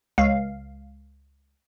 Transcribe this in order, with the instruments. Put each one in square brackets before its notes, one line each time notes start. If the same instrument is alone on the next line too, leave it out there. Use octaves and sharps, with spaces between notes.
[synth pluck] C#2 F5